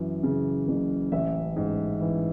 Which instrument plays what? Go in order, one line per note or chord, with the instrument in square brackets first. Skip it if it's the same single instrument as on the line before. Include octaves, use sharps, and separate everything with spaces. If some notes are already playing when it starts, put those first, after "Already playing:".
Already playing: [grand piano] F#2 E3
C#3
F#1
A1 E5
G#2
E3